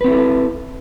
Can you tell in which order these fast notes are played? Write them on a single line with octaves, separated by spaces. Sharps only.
B4 C4 E4 A4